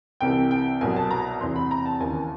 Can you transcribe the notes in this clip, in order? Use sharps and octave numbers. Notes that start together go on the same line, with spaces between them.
C2 C3 E3 G5
G5
C2 B2 F#3 G#5
A5
A#5
E2 C3 E3 C6
B5
A#5
A5
D#2 C#3 E3 G#5